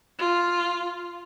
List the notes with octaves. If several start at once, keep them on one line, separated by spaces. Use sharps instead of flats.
F4